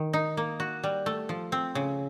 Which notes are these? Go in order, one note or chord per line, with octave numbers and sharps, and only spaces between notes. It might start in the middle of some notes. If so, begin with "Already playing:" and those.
Already playing: D#3
D#4
A#3
F#4
G3
A3
F3
C4
C#3